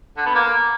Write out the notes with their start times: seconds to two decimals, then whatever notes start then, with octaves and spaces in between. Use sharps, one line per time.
0.17 D3
0.26 B3
0.35 A#3